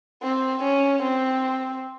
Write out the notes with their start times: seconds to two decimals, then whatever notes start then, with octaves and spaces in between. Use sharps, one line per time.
0.23 C4
0.63 C#4
1.02 C4